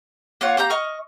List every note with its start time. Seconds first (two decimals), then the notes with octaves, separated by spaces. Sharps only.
0.41 A#3 F4 C#5 F#5
0.57 A#3 G4 A#5 G6
0.70 D#5 C#6 F6